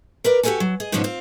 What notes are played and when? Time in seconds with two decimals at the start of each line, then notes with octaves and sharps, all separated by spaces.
0.24 A#4 B4 D5
0.43 F#4 G4 A4 A#4 D5 G#5
0.60 F#3
0.80 G#4 D#5
0.92 G#2 B2 F3 B3 C#4 D4
1.04 C4 F4